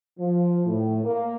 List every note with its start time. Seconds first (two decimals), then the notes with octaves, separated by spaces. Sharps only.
0.19 F3
0.66 A2
1.04 A#3